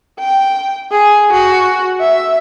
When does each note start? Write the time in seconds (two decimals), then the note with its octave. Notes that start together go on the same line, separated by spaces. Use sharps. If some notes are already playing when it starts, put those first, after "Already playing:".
0.19 G5
0.91 G#4
1.33 F#4
2.01 E5